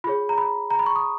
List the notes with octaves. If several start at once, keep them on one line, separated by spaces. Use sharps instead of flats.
F4 G#4 C#5 B5
A#5
B5
A#5
B5
C#6
D#6